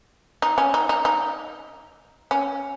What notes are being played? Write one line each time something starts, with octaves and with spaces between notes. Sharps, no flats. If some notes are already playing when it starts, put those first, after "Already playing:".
D#4
C#4
D#4
D#4
D#4
C#4